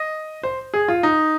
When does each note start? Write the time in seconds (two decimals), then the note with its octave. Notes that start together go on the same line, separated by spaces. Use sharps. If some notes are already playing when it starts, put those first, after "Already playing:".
Already playing: D#5
0.43 C5
0.74 G#4
0.88 F4
1.03 D#4